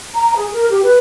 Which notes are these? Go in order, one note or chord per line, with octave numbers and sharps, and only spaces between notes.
A#5
G#4
A#4
G4
B4